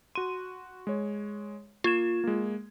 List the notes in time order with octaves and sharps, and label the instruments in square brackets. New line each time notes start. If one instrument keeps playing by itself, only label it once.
[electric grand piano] F#4 D#7 [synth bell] C6
[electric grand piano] G#3 C#5
[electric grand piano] A#3 G#6 [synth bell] F4 E7
[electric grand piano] G#3 A#3